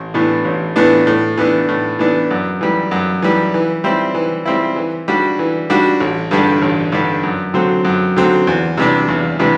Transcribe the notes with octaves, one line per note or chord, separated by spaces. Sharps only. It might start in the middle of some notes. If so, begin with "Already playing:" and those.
Already playing: A1
A2 E3 B3 D4
A1
A2 E3 B3 D4
A2
E3 B3 D4
A2
E3 B3 D4
F#2
E3 G3
F#2
E3 G3
E3
G3 C4 E4
E3
G3 C4 E4
E3
G3 D4 F#4
E3
G3 D4 F#4
A1
G2 D3 G3 D4
A1
G2 D3 G3 D4
F#2
D3 F#3 C4
F#2
D3 F#3 C4
E2
C3 E3 G3 D4
E2
C3 E3 G3 D4